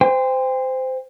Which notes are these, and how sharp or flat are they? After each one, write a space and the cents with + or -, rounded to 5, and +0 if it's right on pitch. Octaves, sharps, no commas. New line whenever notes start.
C5 -20 G5 +35